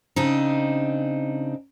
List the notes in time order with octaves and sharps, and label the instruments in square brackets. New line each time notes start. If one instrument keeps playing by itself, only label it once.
[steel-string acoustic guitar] C#3 C4 D4 D#4